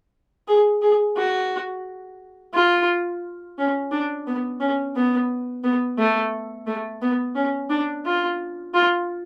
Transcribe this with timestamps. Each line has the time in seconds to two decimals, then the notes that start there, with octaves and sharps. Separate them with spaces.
0.48 G#4
0.82 G#4
1.17 F#4
2.54 F4
3.58 C#4
3.91 D4
4.27 B3
4.60 C#4
4.96 B3
5.64 B3
5.98 A3
6.67 A3
7.02 B3
7.35 C#4
7.70 D4
8.05 F4
8.74 F4